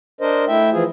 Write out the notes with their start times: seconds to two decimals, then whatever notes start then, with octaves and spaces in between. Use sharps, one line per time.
0.21 D4 A#4 C5 D#5
0.48 A3 E4 E5 G5
0.72 E3 F3 F4 G#4